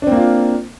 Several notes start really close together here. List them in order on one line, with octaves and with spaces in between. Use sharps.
D4 C4 A#3 F4